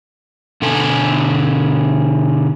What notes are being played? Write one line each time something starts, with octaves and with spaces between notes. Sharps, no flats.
B2 D3 A4 G#5